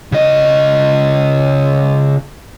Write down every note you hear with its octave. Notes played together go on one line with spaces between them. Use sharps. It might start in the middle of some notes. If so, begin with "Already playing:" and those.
C#3 D#5